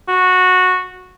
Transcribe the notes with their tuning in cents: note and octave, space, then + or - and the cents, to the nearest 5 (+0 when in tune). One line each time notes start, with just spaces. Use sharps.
F#4 -15